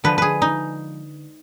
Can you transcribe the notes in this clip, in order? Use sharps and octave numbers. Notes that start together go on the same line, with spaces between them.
D3 F3 G#3 B4
G#4 B4
D#4